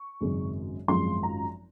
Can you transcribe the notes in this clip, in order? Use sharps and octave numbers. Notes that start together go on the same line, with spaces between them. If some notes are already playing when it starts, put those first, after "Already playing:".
Already playing: C#6
G#1 F#2 C#3 G#3
G#1 F#2 F3 G#3 C6
A#5